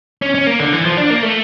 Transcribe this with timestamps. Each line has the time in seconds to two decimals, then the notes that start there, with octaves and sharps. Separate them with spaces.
0.22 C#4
0.35 C#4
0.47 A#3
0.60 D3
0.73 E3
0.85 F3
0.97 D4
1.10 A#3
1.23 A3